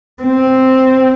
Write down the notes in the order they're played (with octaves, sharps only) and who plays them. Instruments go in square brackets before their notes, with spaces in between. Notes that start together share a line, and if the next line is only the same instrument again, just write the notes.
[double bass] C4